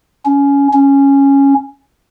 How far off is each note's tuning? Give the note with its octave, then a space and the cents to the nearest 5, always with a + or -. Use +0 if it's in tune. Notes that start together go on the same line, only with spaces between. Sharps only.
C#4 +15
C#4 -5